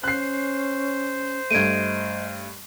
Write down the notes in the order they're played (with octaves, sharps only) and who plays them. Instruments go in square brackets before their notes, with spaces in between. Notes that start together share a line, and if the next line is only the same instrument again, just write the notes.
[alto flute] C#4 [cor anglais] C5 [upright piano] F#6 C7
[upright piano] G2 A3 [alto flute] D#5 [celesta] G#6 D7 D#7